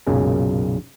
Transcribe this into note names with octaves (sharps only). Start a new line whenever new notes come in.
B1 F#2 A#2 C#3 G#3